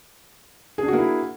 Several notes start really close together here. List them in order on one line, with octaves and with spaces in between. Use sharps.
G#4 D4 F#4 A#3 E4